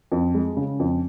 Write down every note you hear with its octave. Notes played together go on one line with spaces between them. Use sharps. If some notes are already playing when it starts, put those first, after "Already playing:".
F2
G#3
C#3
F2